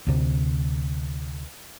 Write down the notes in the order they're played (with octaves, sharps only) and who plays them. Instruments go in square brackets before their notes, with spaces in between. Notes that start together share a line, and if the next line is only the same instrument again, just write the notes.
[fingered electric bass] D2 C3